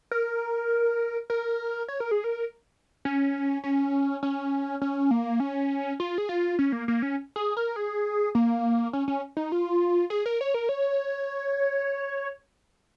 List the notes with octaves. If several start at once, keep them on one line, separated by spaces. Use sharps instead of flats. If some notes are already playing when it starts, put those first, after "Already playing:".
A#4
A#4
C#5
A#4
G#4
A#4
C#4
C#4
C#4
C#4
A#3
C#4
F4
G#4
F4
C#4
A#3
A#3
C#4
G#4
A#4
G#4
A#3
C#4
C#4
D#4
F4
G#4
A#4
C#5
A#4
C#5